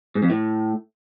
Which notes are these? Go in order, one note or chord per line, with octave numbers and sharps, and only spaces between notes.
G#2
F2
A2